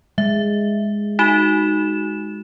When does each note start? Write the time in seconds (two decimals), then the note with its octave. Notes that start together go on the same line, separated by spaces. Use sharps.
0.18 G#3 E5
1.19 D#4 F#4 E7